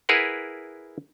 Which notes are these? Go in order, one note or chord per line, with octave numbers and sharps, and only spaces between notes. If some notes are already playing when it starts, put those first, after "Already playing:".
E4 G#4 A#4 B4 F#5